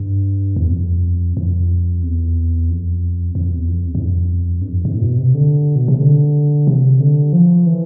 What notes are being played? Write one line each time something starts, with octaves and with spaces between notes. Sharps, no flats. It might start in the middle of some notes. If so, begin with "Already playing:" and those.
Already playing: G2
E2
F2
F2
E2
F2
F2
E2
F2
E2
G2
F2
G2
F2
G2
A2
B2
C3
D3
B2
C3
D3
C3
D3
F3
E3